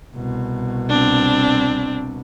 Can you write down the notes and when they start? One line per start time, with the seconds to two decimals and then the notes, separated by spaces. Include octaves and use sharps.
0.15 C2 B2
0.89 C4 D4